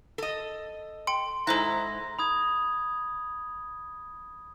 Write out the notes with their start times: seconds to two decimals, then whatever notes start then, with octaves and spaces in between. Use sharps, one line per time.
0.18 A4 D#5
1.07 G5 C6 C#7
1.47 G#2 E4 A4 C5 A#5 F#6
2.19 B5 D#6 G#6